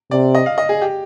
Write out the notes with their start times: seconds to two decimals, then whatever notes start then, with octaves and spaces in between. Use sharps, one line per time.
0.11 C3 D5
0.35 D#5
0.46 F5
0.58 D#5
0.69 G#4
0.82 G4